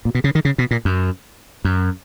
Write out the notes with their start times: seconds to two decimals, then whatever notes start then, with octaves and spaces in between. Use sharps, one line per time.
0.05 A#2
0.15 B2
0.24 C#3
0.35 D#3
0.45 C#3
0.58 B2
0.71 A#2
0.85 F#2
1.65 F#2